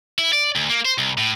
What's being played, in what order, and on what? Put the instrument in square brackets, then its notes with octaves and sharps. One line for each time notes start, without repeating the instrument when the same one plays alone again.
[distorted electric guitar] E4
D5
D2
A#3
C5
C2
A2